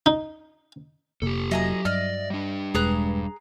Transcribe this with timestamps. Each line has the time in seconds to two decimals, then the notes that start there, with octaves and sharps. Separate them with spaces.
0.06 D#4
1.22 F1 C3 A#3 G4 A4
1.51 F#3 D#5 E5 G#5 A#5
1.85 G2 D5 D#5 F6
2.30 G3 D4
2.74 E1 G#3 G#4 B4 A#5 F#6